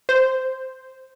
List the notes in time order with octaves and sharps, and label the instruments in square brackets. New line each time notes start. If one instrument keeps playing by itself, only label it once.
[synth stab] C5